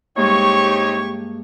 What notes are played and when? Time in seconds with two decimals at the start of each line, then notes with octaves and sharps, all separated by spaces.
0.17 G2 C3 G#3 A#3 D#4 G4 C#5 C#6